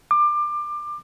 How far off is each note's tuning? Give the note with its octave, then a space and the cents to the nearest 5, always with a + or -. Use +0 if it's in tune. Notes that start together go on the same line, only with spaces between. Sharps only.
D6 +25